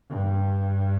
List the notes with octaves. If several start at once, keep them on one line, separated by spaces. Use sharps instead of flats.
G2